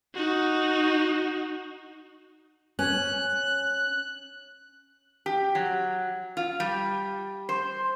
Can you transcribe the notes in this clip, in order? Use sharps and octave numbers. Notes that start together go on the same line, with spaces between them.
D#4 F#4
C#4 F#6
G4
F#3
F4
G3
C5